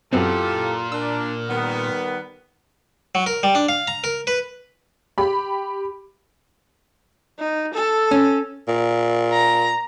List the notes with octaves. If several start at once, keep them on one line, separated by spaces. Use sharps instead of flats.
F#2 A#2 B3 C4 E4 F4 G4 A4
D4 A#4 E6
D#3 G3 B3
F#3
A#4
G3
D4
F5
A#5
A#4
B4
G4 B5
D#4
A4
C#4
A#2
A#5